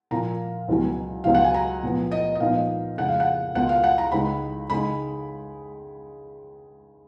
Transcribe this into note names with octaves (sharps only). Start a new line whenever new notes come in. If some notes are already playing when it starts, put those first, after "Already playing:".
A#2 F3 A#3 F4 A#5
C#2 B2 F#3 C#4
C#2 B2 F#3 F5
F#5
G#5
A#5
A#2 F3 B3
D#5
D#5
A#2 F3 B3 D#4 F5
F2 C#3 G#3 F#5
F5
F#5
C#2 B2 A#3 F4 F#5
F5
F#5
A#5
C#2 C#3 G#3 D#4 B5
C#3 G#3 D#4 B5